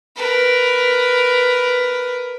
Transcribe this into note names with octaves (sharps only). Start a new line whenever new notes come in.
A#4 B4